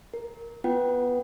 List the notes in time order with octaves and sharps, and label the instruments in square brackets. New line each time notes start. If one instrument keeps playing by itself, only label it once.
[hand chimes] A#4
[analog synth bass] B3 [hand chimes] F4 F#5 G5